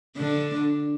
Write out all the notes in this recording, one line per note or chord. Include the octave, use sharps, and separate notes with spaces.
D3 D4